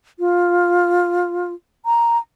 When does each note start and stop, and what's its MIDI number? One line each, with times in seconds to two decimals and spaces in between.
0.19 1.53 65
1.86 2.18 82